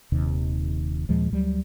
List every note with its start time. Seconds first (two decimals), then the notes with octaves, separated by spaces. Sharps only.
0.12 D#1 D#2 C3 D#3
1.09 D#2 A#2 F3 G#3
1.32 D2 F#3 G3